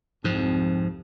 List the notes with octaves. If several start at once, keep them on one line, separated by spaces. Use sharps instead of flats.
C2 F2 G#2 F3